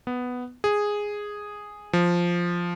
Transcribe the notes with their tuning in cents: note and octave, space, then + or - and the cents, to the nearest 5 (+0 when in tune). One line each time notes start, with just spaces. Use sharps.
B3 +5
G#4 -5
F3 +0